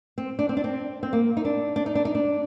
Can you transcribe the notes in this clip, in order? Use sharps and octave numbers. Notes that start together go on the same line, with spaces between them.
C4
D4
C4
D4
C4
C4
A#3
D#4
D4
D4
D#4
D4
D#4
D4